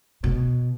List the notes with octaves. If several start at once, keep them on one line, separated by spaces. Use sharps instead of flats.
B2